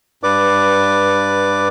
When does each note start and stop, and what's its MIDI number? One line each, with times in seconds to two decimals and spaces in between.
0.23 1.68 43
0.23 1.68 71
0.23 1.68 74
0.23 1.68 86